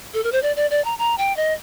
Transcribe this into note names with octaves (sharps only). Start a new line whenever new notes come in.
A4
A#4
C5
D5
D5
D5
A#5
A#5
G5
D#5